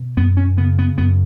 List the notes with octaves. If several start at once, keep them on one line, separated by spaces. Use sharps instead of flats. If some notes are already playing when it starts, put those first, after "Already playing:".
Already playing: B2
F#2 B3
C#4
C#3 B3
B3
F#2 B3